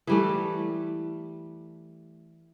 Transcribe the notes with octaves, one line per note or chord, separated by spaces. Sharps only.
E3 G3 A3